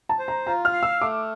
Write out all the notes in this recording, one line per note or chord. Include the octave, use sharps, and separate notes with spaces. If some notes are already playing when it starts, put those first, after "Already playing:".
A5
C5
A#5
F4 A#5
F6
F5
E6
A3 D6